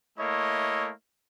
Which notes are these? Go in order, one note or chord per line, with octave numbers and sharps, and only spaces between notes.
A3 A#3 E4 C#5 D#5